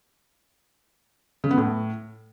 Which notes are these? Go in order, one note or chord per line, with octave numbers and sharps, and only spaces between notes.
C#3
B3
A2